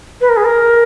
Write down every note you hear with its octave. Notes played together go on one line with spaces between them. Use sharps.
B4
A#4
G#4
A#4